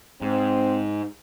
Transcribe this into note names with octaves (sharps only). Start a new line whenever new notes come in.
G#2 C4